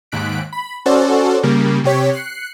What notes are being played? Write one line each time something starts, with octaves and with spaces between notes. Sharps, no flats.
D#2 G#2 F#6 B6 D7
B5
C#4 F#4 A4 C5 D5
C#3 G3 A#3
C3 G4 C#5 B6
F#6 C7 C#7